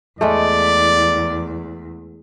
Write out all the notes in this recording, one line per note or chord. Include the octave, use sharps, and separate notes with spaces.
E2 G#3 A3 D5